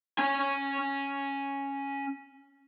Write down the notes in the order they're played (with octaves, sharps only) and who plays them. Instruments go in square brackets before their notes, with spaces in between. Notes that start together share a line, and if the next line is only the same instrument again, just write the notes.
[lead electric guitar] C#4 G#5